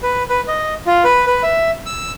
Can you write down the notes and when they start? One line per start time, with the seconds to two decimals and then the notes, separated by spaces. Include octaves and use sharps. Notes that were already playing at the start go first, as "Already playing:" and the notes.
0.03 B4
0.29 B4
0.48 D#5
0.86 F4
1.04 B4
1.26 B4
1.43 E5
1.86 E6